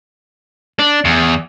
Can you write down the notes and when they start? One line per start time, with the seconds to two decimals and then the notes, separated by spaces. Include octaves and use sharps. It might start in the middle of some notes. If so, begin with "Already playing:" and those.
0.79 D4
1.05 E2